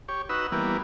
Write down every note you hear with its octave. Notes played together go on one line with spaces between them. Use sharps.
G4 C#5
D#4 F#4 B4 E6
E3 G3 A#3 B3